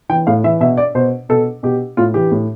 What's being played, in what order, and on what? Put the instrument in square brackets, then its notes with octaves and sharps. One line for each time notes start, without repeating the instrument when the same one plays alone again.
[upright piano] E3 G5
A2 F5
E3 E5
B2 E5
D5
B2 C5
B2 A4
B2 G4
A2 F4
E3 G4
A2